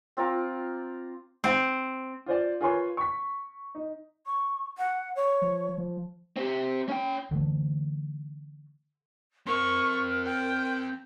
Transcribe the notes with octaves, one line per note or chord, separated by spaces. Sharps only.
C4 F4 A#5 D6
C4
F4 C5 D5
F4 G#4 A#4 B4 C#5 C6
C#6 B6
D#4
C#6
F#5
C#5
F3
F3
C4 G4
C#4 G5
D3 E3 A3
C4 A#4 F5 C#6
G5